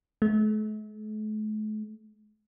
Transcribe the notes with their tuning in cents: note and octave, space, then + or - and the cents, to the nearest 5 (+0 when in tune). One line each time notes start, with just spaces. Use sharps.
A3 -45